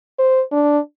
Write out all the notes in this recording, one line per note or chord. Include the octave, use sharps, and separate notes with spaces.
C5
D4